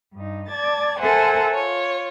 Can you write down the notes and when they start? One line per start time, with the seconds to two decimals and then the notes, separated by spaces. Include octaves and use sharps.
0.14 G2 D#4
0.49 D5 A5 G#6 A6
1.00 A4 A#4 C5 E5 F#5 G#5
1.55 F4 C#5